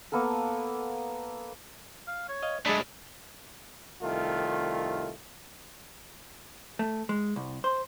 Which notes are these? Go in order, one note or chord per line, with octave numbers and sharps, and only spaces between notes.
A#3 B3 A4 A#4
F5
C#5
D#5 F5
F#3 G#3 A3 D4 G#4 D5 B5 A6
C2 D#3 A3 F4
A3
G#3
C2
C5